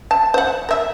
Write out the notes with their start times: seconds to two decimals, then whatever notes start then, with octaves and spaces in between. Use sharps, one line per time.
0.11 A5
0.34 C5 F#5
0.69 A#4 E5